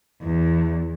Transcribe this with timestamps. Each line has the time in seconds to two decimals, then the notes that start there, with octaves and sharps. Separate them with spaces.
0.21 E2